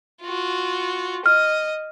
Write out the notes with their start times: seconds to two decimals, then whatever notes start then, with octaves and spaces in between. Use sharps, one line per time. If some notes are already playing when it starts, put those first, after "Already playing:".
0.22 F4 F#4
1.26 D#5 F6